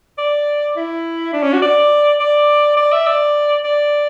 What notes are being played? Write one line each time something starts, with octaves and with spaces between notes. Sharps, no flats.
D5
E4
D4
C#4
F#4
D5
D5
D5
E5
D5
D5